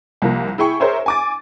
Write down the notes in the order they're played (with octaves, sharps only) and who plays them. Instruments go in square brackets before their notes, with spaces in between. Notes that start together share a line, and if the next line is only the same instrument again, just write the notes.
[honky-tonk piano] C2 F3 A#3
E4 G#4 G5 C#6
G#4 A#4 C5 C#5 E5
G#5 D6 A6